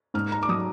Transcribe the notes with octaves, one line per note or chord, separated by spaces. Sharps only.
G#2 F6
A#5
D6
F#3 D#6